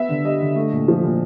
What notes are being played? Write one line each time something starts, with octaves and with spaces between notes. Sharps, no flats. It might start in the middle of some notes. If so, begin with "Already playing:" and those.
Already playing: B3 E5
D3
G3 D#5
D3
A3
A#2
F3
A#2